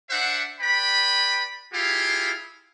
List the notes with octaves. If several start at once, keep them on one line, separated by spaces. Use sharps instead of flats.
D4 C5 E5 F#5
B4 D5 G5 B5
E4 F4 G4 G#4 F5